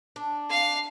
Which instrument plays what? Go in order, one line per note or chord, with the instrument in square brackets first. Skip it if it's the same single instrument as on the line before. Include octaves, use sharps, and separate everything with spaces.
[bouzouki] D4
[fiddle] F5